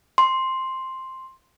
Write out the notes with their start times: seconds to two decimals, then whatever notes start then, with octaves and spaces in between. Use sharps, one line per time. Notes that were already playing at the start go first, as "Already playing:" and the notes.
0.18 C6